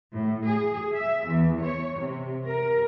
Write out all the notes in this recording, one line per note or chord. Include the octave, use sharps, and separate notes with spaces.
A2
G#4
E5
E2
C#5
C3
A#4